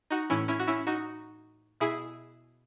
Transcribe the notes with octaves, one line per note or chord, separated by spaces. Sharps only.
D#4 F#4
A2 E3 C#4 E4
C#4 E4
F#4
C#4 E4
D#4 F#4
B2 E4 G#4